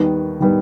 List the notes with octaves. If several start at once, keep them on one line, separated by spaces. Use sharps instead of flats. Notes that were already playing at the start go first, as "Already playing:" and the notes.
Already playing: D#2 D#3 G3 B3
D#3 G3 B3